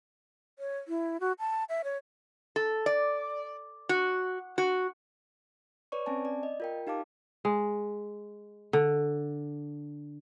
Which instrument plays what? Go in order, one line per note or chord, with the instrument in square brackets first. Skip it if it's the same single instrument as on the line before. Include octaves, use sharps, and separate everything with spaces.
[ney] C#5
E4
F#4
A5
E5
C#5
[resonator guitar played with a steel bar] A4
D5
F#4
F#4
[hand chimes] B4 C#5 D5 C#6
C4 C#4 G#5 A5
D5
D#5
F4 A#4 G5
D#4 G4 F5 A5 D6
[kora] G#3
D3